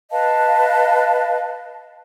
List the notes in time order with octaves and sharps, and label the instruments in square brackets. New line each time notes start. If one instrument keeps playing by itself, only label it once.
[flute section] B4 D#5 F5 A5